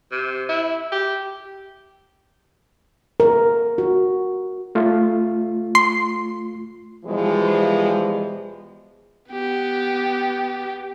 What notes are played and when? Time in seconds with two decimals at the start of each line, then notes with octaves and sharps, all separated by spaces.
0.12 C3
0.49 E4
0.92 G4
3.20 A#4
3.78 F#4
4.75 A3 F4
5.75 C6
7.05 B2 E3 F3 G3 G#3
9.31 B3 G4